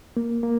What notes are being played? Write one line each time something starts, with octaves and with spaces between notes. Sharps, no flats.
A#3
A#3